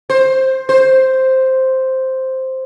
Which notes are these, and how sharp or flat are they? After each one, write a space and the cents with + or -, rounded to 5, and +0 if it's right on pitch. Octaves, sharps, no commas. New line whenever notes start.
C5 +10
C5 +0